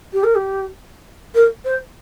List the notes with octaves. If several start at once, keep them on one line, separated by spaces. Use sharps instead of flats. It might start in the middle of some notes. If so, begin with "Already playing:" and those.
G4
A#4
G4
A#4
C5